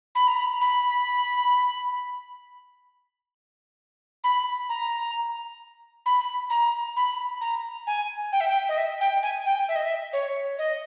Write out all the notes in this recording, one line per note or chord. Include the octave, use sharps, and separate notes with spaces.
B5
A#5
B5
B5
B5
A#5
B5
A#5
B5
A#5
G#5
G5
E5
G5
D#5
E5
G5
G#5
G5
E5
D#5
E5
C#5
D#5